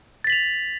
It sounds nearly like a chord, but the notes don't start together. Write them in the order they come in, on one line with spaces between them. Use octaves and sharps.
A6 B6 F#7 F7